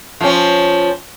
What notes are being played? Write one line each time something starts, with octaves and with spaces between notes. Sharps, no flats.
F3 C#4